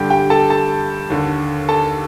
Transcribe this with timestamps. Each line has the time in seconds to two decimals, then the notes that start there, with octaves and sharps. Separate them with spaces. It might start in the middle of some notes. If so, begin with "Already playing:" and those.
Already playing: G2 D3 G4 G5
0.10 G4 G5
0.30 A4 A5
0.50 A4 A5
1.10 D#2 D3
1.69 A4 A5